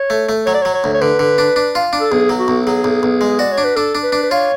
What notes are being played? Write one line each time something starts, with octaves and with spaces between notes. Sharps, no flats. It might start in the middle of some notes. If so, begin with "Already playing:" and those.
Already playing: C#5
A3
A3
F#3 C#5
D5
C#5
F#3
C#5
D2
C#5
D3 B4
D3
D4
D4
F4
D4
A4
B1 G#4
F#3
F#4
B1
F#3 G#4
B1
B1
G#3
F#4 D5
C#5
D4
B4
D4 A4
D4
B4
D4
B4
F4 C#5